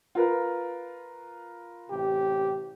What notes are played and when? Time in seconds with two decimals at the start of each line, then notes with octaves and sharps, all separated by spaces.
0.15 F4 A#4 B4
1.91 A1 C3 G4